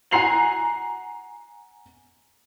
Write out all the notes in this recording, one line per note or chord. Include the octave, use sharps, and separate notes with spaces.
F#5 G#5 A#5 C7 F7 F#7